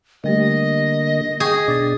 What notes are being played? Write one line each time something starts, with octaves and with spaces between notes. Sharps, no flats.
D3 G3 A3 A#3 G4 D#5
G#4 G5 C#6 G6
B2 D4 D6 A6